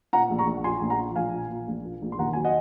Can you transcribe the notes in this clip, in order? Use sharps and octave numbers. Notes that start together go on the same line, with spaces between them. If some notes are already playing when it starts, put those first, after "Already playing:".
A#2 F#5 A#5
A#1
A#5 C#6
A#1
F3 G#5 C6
A#1
F#5 A#5
F3
A#1 F5 G#5
A#2
A#2
A#1
A#2
A#1
C6
D#2 F#5 A#5
F#3 G#5
D#5 F#5